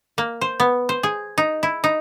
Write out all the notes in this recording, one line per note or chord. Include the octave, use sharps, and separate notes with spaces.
A#3
C5
B3
C5
G#4
D#4
E4
D#4